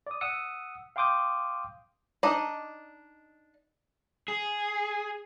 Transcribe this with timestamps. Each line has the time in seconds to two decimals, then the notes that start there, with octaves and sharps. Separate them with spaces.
0.07 D5 D#6
0.21 F#5 D#6 E6 C#7
0.96 F5 G5 C6 D6 D#6 G6
2.23 D4 D#4 D5 D#5
4.28 G#4